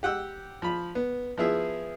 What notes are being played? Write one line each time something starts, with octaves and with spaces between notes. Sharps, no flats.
G4 F#5 G5 E6
F3 B5
B3
F3 B3 E4 G#4 E5